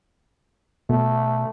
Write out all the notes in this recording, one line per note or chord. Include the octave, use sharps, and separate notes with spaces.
B2 A3